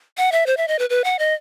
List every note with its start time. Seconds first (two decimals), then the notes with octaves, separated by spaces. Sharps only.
0.18 F#5
0.32 E5
0.46 C5
0.57 E5
0.68 D#5
0.79 B4
0.90 B4
1.04 F#5
1.19 D#5